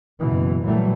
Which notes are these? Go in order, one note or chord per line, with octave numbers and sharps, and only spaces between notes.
F#1 B2 E3
A#2 E3 F#3 G3 A3